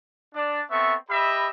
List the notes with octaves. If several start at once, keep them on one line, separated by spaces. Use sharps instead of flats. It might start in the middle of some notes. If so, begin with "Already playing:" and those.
D4 D5
B3 C4 A4 E5 C#6
G4 D#5 E5 B5